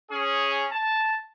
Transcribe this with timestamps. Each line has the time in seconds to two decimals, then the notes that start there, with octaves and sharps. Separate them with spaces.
0.11 C#4 G#4
0.72 A5